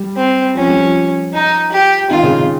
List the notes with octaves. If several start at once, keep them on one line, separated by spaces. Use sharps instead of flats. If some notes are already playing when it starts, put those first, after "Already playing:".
Already playing: G3
C4
F3 C#4
G3
F3
D#4
G4
D#3 F4
C#3
C#3